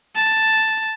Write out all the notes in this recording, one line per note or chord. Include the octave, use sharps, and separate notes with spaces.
A5